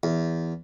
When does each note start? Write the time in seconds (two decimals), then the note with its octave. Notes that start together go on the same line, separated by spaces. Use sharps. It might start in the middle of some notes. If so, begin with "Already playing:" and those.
0.03 E2